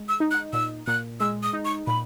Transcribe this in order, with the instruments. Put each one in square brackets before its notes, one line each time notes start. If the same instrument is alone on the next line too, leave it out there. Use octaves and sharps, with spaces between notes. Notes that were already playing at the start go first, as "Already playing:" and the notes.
Already playing: [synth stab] G#3
[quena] E6
[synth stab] D#4
[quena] F#6
[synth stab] A#2 [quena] E6
[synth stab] A#2 [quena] F#6
[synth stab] G#3 [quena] E6
[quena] D#6
[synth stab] D#4
[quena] C#6
[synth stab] A#2 [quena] B5